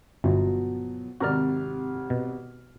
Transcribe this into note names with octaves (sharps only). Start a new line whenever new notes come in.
G1 B2 F3 F#3
G#1 C3 F#4 A#4 D5 F6
B2